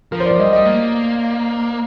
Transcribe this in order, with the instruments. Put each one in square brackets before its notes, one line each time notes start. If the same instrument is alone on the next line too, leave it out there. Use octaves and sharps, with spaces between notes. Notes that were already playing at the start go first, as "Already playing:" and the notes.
[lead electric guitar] F3 [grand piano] A#4
[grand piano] C5
D5
[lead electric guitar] F3
[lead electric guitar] G3 [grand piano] D#5
[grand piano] D#5
[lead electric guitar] A#3